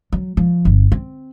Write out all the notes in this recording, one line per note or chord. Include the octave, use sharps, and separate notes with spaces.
F#3
F3
G1
C4